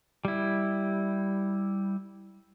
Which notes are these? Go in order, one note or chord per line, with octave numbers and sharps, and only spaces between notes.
G3 E4